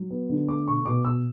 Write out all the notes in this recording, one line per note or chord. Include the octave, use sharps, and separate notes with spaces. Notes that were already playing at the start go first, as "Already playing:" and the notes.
Already playing: F#3
B3
D3
A3 D6
B2 C#6
B2 D6
B2 E6